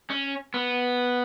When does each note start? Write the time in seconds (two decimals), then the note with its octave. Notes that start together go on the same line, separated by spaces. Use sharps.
0.10 C#4
0.54 B3